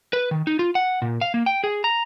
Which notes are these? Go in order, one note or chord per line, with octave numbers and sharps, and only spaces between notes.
B4
D#3
D#4
F4
F#5
A#2
F5
A#3
G5
G#4
A#5